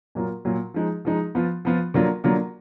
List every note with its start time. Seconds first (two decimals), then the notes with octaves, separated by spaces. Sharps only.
0.15 A#2 F#3 A#3 F4
0.45 A#2 F#3 A#3 F4
0.74 F3 G#3 D#4
1.05 F3 G#3 D#4
1.35 F3 B3 F4
1.65 F3 B3 F4
1.94 D3 F#3 A#3 F4
2.24 D3 F#3 A#3 F4